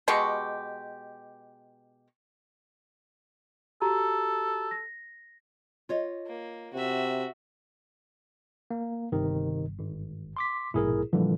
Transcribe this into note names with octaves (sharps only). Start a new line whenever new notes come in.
B2 G#3 G4 C#6
F#4 G4 A4 A#5
A#6
F4 C#5 D#5
A#3
C3 F#4 E5
A#3
G1 C3 D#3
G#1
C6 D6 B6
A#1 G#2 B2 E4 G#4 A#4
A#2 D3 E3 F3 G3